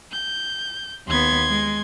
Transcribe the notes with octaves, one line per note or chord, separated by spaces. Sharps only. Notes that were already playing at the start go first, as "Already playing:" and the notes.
G6
D#2 B3 C6 G#6
G#3